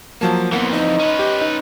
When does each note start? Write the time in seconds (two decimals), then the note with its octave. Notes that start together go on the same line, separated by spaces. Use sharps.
0.21 F3 F#3 A#3 A5
0.52 F2 E3 A#3 B3 F#5
0.73 D#4 D#5
0.99 C#4 B4
1.19 G4
1.41 D#4